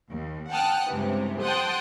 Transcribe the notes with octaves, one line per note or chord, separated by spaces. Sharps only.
D#2
F#5 G5 A5 D#6 F6 F#6
C#2 G2 C3 E3
F#5 G5 A5 C6 D#6 F#6